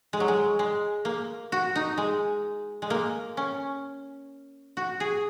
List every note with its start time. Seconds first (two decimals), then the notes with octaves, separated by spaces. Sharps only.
0.13 G#3
0.20 F#3
0.28 G#3
0.59 G#3
1.05 A#3
1.52 F#4
1.76 D#4
1.98 G#3
2.82 G#3
2.90 A#3
3.37 C#4
4.77 F#4
5.00 G#4